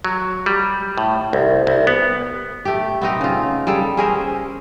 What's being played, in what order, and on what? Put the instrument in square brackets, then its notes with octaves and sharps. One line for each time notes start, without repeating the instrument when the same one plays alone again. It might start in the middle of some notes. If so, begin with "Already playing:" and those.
[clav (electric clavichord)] F#3
G3
A2
C2
C2
B3
[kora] A3 G4
B3 C4 D#4
C#3 F4
G3 G#4 A4
C#4 G#4 A#4 C5